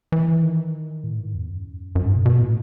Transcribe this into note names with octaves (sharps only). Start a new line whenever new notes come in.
E3
D#3
A2
G#2
E2
F#2
F#2
G#2
B2
B2
A2